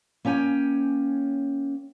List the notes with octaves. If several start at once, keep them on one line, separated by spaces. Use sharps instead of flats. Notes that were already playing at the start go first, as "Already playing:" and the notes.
A#3 C#4 C#5 G5 G#5